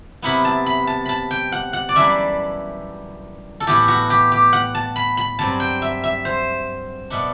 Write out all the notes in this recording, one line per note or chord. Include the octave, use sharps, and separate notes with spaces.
C3 F#3 B3 E4 B5
A5
B5
A5
A5 B5
G5
F#5
F#5
D5
F#2 E3 G3 D4 E5
A4
A2 E3 B3 E4 G4
F#4
G4
G4
F#5
A5
B5
B5
G2 F#3 C4 A5
G5
E5
E5
C5
B2 A3 D4